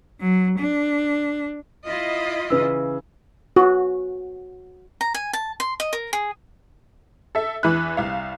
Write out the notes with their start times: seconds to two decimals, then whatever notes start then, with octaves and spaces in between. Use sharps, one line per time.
0.20 F#3
0.58 D4
1.87 E4 F4 D#5
2.50 C#3 E3 B4 E6
3.56 F#4
5.01 A#5
5.15 G#5
5.33 A5
5.60 C6
5.80 D#5
5.93 A#4
6.13 G#4
7.35 A4 E5
7.63 E2 E3 B4 E5 B5 F#6
7.97 C2 F5